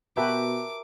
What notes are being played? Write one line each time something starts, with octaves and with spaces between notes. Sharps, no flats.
B2 F#4 G4 A#4 B4 E5 A5 D6